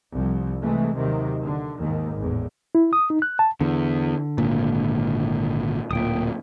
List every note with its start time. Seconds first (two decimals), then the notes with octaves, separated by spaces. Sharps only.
0.12 C2 F3
0.62 C3 E3 G#3 A3
0.95 D#2 C3 D#3 F#3
1.43 D3
1.79 D#2 G#2 D#3
2.18 G#1 E2 A2
2.75 E4
2.93 D#6
3.10 D#4
3.22 F#6
3.39 A5
3.60 E2 D3
4.38 G#1 A#2
5.91 D1 A#2 G5 D#6